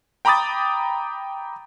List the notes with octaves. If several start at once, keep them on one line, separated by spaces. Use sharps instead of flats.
G5 A#5 B5 D6 D#6 A6